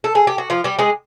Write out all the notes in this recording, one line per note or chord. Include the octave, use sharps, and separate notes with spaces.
A4
G#4
G4
F#4
F3 F4
G3 G4
G#3 G#4